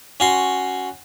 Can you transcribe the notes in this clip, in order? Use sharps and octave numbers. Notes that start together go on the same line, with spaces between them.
C#4 F#4 C6